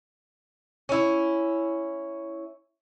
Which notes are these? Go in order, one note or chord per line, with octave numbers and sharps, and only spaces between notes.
C#4 E4